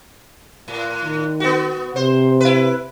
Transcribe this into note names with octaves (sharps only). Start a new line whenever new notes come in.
A2
D#3
B3 F#4
C3 C5
E4 B4